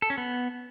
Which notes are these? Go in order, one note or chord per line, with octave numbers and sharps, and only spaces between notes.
A4
C#4
B3